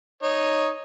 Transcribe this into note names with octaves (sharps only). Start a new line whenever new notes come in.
D#4 C#5